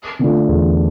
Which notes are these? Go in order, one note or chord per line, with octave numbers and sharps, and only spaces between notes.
D3 A3 D4 F4
E2